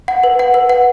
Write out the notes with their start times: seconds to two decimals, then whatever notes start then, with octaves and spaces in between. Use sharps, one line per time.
0.08 F#5
0.24 B4
0.39 F#5
0.54 B4
0.69 F#5